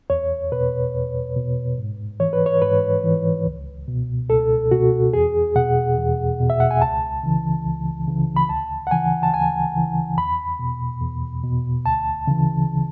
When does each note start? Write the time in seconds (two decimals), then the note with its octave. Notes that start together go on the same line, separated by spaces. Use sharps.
0.10 E2 C#5
0.52 B2 B4
0.94 E2
1.36 B2
1.78 G#2
2.20 E3 C#5
2.33 B4
2.46 C#5
2.62 G#2 B4
3.04 E3
3.46 C#2
3.88 B2
4.30 C#2 A4
4.71 B2 F#4
5.13 E2 G#4
5.56 B2 F#5
5.98 E2
6.40 B2
6.50 E5
6.60 F#5
6.71 G#5
6.81 C#2 A5
7.23 C#3 E3
7.65 C#2
8.07 C#3 E3
8.36 B5
8.49 D2 A5
8.87 F#5
8.91 C#3 E3 G#5
9.23 A5
9.34 D2 G#5
9.75 C#3 E3
10.17 E2 B5
10.59 B2
11.01 E2
11.43 B2
11.86 D2 A5
12.27 C#3 E3